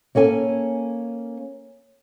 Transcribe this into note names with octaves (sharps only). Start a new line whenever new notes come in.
A#3 C#4 A4 G#5